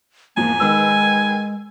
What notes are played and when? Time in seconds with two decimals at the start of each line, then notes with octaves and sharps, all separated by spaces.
0.37 E2 G#2 F3 A#3 G#5
0.60 D#3 G#3 B4 E6